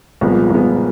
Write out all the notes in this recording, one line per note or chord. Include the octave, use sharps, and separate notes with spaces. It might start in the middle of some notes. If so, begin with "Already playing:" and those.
C2 A#2 F3 G#3 B3
C2 A#2 F3 G#3 B3